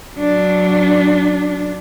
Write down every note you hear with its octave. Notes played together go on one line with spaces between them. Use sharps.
F#3 D4